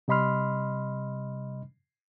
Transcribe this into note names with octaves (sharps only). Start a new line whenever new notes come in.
C3 G3 D#5 B5 C6 F6